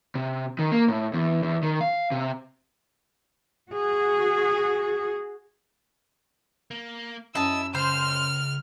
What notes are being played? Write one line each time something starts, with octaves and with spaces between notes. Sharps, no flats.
C3
D#3
A#3
A2
E2
E2
D#3
F5
C3
F#4 G#4
A#3
F#2 E4 D#5 A5 E6
C#2 C5 F6